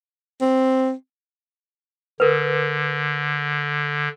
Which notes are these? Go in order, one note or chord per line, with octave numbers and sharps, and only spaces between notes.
C4
D3 A#4 B4